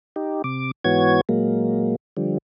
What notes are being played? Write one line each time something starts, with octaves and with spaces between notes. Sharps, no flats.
D#4 G4
C3 D6
G#2 E3 B3 F#4 C#5 G#6
A#2 F#3 G#3 A#3
D3 F3 G3